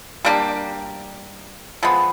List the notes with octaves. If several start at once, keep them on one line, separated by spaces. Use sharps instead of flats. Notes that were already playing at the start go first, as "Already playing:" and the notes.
G3 A#3 D4 G4
F3 G#3 B3